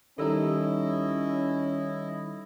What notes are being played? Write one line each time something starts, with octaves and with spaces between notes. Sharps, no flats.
D#3 G3 C#4 D#4 E4 A4 D#5 E6